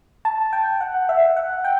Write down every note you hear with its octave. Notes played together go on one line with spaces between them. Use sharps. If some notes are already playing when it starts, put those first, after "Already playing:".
A5
G5
F#5
E5
F#5
G5